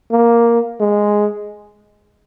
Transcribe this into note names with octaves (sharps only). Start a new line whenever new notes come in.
A#3
G#3